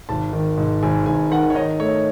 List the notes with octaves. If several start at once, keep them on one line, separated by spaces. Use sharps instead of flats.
G#1 A5
D#3
G#2
G#1 G#5
G#1 G#5
D#3 F#5
C#5
D#4 D#5
A3 C#5